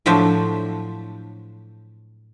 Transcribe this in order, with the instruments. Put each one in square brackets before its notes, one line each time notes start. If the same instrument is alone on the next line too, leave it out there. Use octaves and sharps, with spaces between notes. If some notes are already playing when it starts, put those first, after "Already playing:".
[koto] A2 F3 F#3 D4 C5 E5